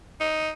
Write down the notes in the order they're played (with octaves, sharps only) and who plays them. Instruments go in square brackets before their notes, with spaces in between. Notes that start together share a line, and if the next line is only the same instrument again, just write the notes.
[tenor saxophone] D#4